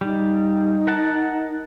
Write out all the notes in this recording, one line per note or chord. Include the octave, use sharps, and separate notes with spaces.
G3 D#4
A#4 F#5 A5